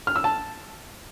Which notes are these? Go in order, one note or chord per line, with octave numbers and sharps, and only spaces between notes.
F6
E6
A5